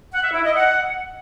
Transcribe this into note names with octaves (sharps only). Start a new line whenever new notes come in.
F#5
E5
E4
D#5
F#5